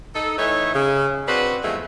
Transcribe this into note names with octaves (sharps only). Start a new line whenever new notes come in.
D#4 A4
E3 A3 D#4 C#5 E5
C#3
C4 D4 F#4 B4
E2 G2 F3 G#3 A3